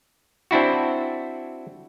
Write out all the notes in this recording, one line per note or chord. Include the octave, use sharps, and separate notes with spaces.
C4 D4 E4 F#4